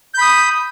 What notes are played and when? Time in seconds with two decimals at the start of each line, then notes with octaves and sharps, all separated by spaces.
0.14 G6
0.18 B5
0.21 D#6